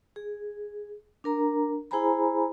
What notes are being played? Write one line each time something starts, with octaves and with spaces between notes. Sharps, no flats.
G#4
D4 A#4 A#5
E4 G#4 C5 G#5 A#5 B5